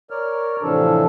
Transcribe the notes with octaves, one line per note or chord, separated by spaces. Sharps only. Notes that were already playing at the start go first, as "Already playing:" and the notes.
A#4 C#5 D5 F6
A2 C3 E3 F3 D4 A4